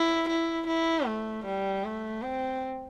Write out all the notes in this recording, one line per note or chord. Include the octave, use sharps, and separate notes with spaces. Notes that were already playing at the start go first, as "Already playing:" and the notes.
Already playing: E4
E4
E4
A3
G3
A3
C4